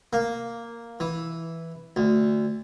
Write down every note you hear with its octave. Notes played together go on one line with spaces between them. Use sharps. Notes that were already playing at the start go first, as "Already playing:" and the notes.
A#3
E3
D2